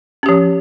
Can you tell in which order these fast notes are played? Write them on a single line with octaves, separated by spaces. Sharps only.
C#4 G4 F3